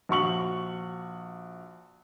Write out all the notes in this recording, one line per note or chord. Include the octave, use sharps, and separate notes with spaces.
A#1 F#4 C#6 F#7